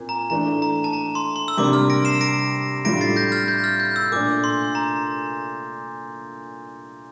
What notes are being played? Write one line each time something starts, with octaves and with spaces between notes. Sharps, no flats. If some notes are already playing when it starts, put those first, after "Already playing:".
Already playing: A#2 C4
A#5
E3 A3 D4 A#5
A#5
A5
A#5
C6
C6
E6
C3 G3 A#3 D4 D6
F6
A#6 D7
C7 E7
A#6 D7
A2 G3 D4 F4 A#6 D7
A6 C7
G6 A#6
F6 A6
G6
F6 A6
G6
E6
A#2 A3 D4 D6
C6
A#5